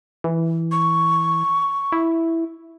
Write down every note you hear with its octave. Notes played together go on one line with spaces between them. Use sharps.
E3
C#6
E4